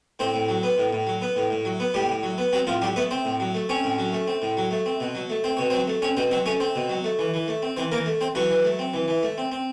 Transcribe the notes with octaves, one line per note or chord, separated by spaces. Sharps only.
A2 C4 C5
A2
F#3
B3
A2
A2
F#3
B3
A2
A2
F#3
B3
A2 G3 G4
A2
F#3
B3
F#3 C4 F#4
A2 F3 F4
F#3 G3 G4
A3 B3 B4
C4 C5
A2
F#3
A3
C4 C#4 C#5
A2
F#3
A3
C4
A2
F#3
A3
C4
B2
F#3
A3
C4 C5
B2 C#5
F#3 C4 C5
A3
C4 C#4 C#5
B2 C4 C5
F#3 C4 C5
A3 C#4 C#5
C4 C5
B2
F#3
A3
E3
E3
A3
C4
E3 C4 C5
E3 A#3 A#4
A3
C4 C5
E3 F#3 F#4
E3
A3
C4
E3
E3
A3
C4
C4